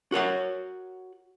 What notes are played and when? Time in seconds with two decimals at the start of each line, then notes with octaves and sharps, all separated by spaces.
0.12 F#4 A#4 C#5 F#5